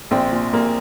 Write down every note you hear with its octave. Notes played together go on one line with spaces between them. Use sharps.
A#1 C4
A#2
A#1 A#3